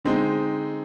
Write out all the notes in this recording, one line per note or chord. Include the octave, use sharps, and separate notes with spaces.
D3 G#3 C4 D#4